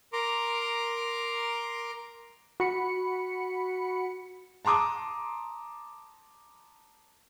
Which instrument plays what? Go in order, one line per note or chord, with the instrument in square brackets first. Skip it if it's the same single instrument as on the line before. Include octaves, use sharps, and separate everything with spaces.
[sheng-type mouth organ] A#4 A#5 C6 D6
[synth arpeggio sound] F#4 B5 C#7
[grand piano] A5 A#5 C6 D6 D#6